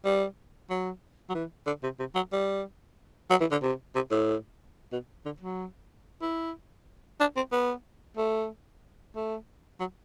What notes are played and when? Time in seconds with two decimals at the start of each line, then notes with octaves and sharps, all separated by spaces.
0.05 G3
0.70 F#3
1.30 F#3
1.34 E3
1.67 D3
1.83 C3
1.99 C3
2.15 F#3
2.32 G3
3.30 F#3
3.40 E3
3.51 D3
3.62 C3
3.95 C3
4.11 A2
4.92 B2
5.25 D3
5.40 F#3
6.22 E4
7.20 D4
7.36 C4
7.52 B3
8.17 A3
9.15 A3
9.80 F#3